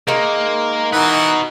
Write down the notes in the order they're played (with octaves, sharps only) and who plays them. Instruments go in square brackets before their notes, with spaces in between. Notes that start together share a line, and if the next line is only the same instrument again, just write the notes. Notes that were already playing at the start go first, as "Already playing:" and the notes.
[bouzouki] D#3 G#3 [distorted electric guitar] A#3
[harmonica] E3 A#4 F#5 [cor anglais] D#4 [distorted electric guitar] F#4 B4